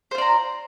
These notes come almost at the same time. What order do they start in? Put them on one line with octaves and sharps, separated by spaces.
C5 F4 D5 A#5